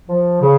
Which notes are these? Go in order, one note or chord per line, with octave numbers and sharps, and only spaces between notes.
F3
C#3